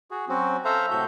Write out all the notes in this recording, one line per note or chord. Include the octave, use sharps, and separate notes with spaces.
F#4 G#4
F#3 C4 C#4 F#4
A4 C5 E5 F5 A#5
A2 C3 F#4 A4 E5 G6